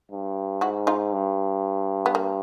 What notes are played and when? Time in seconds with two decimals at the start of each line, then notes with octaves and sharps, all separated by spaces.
0.11 G2
0.61 G#2 E4 F#4
0.87 D#4 F4
1.13 G2
2.06 B3
2.15 A#3